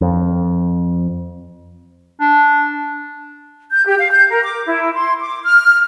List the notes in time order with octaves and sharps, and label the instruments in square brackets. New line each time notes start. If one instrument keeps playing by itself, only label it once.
[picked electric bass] F2
[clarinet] D4
[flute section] G6
G4
F5
G6
A#4
D6
E4
C6
D6
F6